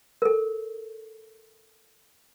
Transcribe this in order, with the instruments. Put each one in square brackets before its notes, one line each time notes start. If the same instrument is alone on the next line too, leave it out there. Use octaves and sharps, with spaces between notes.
[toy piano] A4 A#4